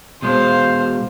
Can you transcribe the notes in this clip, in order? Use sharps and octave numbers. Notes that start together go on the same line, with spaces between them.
B2 G#3 C5 F5